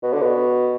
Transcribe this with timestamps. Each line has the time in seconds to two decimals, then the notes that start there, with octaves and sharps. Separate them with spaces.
0.03 B2
0.13 D3
0.22 B2